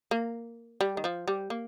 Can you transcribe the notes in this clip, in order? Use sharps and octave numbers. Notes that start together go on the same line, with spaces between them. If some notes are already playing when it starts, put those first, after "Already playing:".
A#3
G3
D#3
F3
G3
A#3